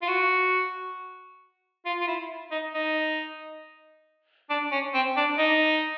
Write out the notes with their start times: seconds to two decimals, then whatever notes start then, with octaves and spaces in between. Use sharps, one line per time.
0.02 F4
0.08 F#4
1.85 F4
2.01 F4
2.07 E4
2.51 D#4
2.74 D#4
4.50 D4
4.72 C#4
4.94 C4
5.17 D4
5.38 D#4